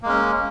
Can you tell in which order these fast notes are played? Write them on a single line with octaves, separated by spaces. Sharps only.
A#3 G#3 C#4